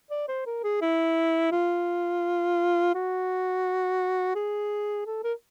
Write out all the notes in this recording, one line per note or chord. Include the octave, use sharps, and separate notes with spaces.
D5
C5
A#4
G#4
E4
F4
F#4
G#4
A4
A#4